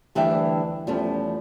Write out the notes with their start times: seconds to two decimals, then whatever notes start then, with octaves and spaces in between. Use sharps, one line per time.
0.15 D2 E3 G3 D4 E5 G5
0.87 E2 F3 G3 A3 C#4